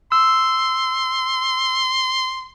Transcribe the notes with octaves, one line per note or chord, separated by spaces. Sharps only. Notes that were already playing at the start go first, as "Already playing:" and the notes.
C6 E6